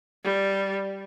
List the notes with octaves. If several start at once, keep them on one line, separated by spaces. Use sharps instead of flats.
G3